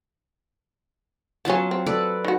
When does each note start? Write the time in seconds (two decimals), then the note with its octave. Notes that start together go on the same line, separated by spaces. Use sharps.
1.45 F#3 B3 C#4 F4 A5
1.71 C4
1.86 A4 B4 D5
2.25 D#3 F#4